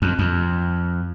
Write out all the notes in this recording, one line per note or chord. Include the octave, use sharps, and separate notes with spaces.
F2
F2